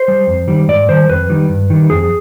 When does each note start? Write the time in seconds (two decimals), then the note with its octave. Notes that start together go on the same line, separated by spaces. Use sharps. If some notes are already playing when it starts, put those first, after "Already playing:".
Already playing: C5
0.08 G3
0.27 F2
0.48 D#3 G3
0.68 G#2 D5
0.89 D#3 G3 C5
1.09 F2 B4
1.30 D#3 G3
1.49 G2
1.70 D#3 G3
1.90 F2 G#4